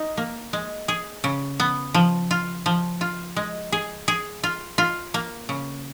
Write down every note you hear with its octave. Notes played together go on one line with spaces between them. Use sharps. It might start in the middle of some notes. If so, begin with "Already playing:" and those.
Already playing: D#4
A#3
G#3
G#4
C#3
B3
F3
F4
F3
F4
G#3
G#4
G#4
F4
F4
A#3
C#3